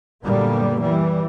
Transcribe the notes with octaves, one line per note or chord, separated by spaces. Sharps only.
F#2 A#2 D3 G3 A#3 B3
E3 G3